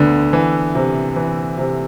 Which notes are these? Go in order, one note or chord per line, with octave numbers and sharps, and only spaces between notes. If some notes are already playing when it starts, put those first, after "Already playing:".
Already playing: D2 D3 B3
E3
C3
E3
C3